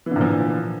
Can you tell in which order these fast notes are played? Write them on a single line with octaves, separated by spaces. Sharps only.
E3 D3 A#2 F3